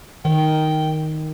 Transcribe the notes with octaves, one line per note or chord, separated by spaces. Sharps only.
D#3 G5